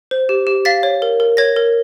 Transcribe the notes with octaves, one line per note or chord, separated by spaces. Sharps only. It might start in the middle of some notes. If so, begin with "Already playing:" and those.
C5
G4
G4
F5 A6 B6
C#5
A#4
A#4
C#5 G#6 A#6
A#4